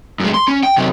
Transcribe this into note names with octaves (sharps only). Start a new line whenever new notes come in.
F#2 G#3
C6
C#4
G5
C3 F#3